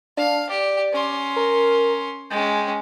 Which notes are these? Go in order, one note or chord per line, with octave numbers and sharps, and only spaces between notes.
D4 F5
G4 D5
C#4 C6
A#4
G#3 C#4 G5